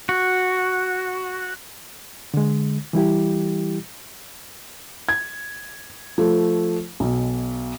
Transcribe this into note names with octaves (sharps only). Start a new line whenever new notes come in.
F#4
D3 G#3
E3 G3 E4 G4
G#6
F3 A3
B1 B2